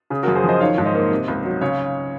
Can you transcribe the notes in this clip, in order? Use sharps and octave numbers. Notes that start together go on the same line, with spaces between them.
C#3 G#4
F#4 A#4
F#2
G#4 C5
F3
C5 D#5
D#3 C#5 F5
G#2
C5 D#5
A#3
C3
C#2
F#3
C#3 C#5 F5